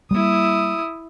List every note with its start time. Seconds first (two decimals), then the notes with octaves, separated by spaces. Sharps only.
0.11 G3 A3 A#3 E4 D#6